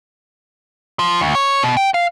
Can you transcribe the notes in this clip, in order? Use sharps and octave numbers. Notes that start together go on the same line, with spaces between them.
F3
D2
C#5
B2
G5
F5